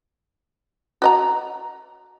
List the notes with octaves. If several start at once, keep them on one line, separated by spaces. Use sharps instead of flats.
F#4 D#5 A#5